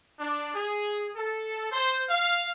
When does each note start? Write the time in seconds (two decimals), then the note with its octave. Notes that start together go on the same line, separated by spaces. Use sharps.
0.20 D4
0.55 G#4
1.16 A4
1.72 C5
2.10 F5